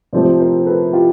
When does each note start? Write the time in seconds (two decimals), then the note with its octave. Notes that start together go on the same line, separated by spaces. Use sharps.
0.13 C3 F3 A3 C4 C5 D5
0.40 A#4 C5
0.59 A#4
0.66 A4 B4
0.93 F4 G4